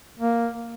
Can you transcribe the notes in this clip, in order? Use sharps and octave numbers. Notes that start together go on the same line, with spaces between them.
A#3